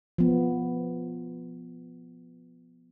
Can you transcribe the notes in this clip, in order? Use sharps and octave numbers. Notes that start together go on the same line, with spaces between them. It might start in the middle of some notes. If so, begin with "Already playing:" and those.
F3 B3